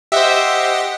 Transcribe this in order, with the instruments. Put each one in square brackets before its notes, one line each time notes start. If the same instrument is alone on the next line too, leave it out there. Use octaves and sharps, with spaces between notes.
[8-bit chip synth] G4 D#5 F#5 [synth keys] C5 E5